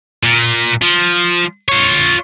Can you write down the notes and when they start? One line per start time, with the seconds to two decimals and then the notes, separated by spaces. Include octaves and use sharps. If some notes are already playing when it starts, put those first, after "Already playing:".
0.24 A#2
0.82 F3
1.69 F4 C#5